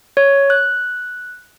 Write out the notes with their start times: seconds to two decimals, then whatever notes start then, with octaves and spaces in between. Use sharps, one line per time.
0.17 C#5
0.50 F#6